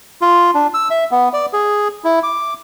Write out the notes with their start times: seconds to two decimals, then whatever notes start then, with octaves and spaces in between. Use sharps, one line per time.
0.22 F4
0.55 D4
0.74 E6
0.91 E5
1.11 B3
1.33 D5
1.53 G#4
2.04 E4
2.23 D6